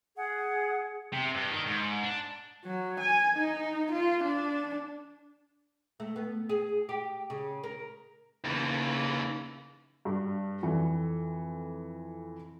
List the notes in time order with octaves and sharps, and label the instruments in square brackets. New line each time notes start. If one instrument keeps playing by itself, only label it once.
[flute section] G#4 F#5
[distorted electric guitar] C3
G2
D#3
G#2
D4
[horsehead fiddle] F#3
G#5
D#4
F4
D4
[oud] A3
B3
G#4
G4
C#3
A#4
[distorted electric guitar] D#2 E3 [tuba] C#3
[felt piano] G2
F2 E3